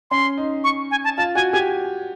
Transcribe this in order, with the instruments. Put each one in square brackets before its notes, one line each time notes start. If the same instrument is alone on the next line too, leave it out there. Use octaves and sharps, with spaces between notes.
[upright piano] C#4 [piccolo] C6
[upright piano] D#4
[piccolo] C#6
G#5
A5
[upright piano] F4 [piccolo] A5
[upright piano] F#4 [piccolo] G#5
[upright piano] G4 [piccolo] G#5